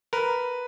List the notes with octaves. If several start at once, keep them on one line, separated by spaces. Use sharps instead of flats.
A#4 B4